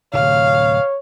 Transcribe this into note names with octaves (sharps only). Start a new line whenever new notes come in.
D1 C3 C#5 F5